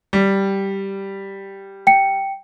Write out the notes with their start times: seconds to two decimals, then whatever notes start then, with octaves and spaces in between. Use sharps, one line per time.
0.13 G3
1.87 G5 C#7